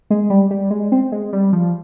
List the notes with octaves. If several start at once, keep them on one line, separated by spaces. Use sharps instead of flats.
G#3
G3
G3
G#3
C4
G#3
G3
F3